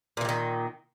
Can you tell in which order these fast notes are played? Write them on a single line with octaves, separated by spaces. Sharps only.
A#2 E3 G3 D#3